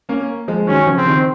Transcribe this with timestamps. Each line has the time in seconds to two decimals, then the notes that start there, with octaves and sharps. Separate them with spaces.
0.09 A#3 C#4
0.48 F3 G#3
0.67 D#3 F#3 C#4
0.87 C#3 F3
0.97 C4
1.07 C3 D#3